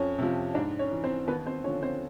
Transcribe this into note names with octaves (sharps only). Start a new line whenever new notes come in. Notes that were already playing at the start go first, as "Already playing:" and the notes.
Already playing: F2 C#4 C#5
C3 F3
G#2 D4 D5
C#4 C#5
E3
C4 C5
D#2 B3 B4
C4 C5
D3 F3 C#4 C#5
C4 C5